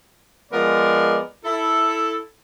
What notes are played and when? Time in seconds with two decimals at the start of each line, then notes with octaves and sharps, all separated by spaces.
0.52 F3 G#3 B3 A#4 D5
1.45 E4 A4